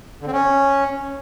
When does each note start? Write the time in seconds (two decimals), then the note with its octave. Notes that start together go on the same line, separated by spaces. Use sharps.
0.22 D3
0.27 C4
0.33 C#4